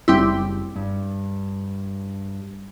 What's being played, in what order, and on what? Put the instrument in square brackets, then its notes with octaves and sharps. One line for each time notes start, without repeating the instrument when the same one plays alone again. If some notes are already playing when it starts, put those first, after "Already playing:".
[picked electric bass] F#1 [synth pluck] G3 C4 E4
[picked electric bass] G2